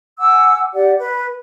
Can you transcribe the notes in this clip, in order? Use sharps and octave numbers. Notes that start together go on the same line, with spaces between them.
F#5 G#5 D6 E6
G4 D5 F#5
B4